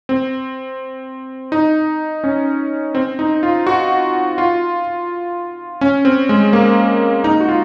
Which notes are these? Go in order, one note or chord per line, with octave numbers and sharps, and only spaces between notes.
C4
D#4
C#4
C4
D#4
F4
F#4
F4
C#4
C4
G#3
A#3
D#4
F#4
F4